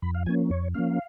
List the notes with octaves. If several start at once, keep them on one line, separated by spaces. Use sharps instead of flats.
F2 B5
F5
F3 A#3 C#4 G#5
F2 C#5
F3 A#3 C#4 F5